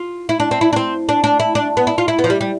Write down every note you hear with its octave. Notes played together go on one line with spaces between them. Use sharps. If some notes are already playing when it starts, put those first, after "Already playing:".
Already playing: F4
E4
D4
C4
E4
D4
C4
D4
D4
E4
D4
B3
E4
F4
E4
B3
F3
G3
G3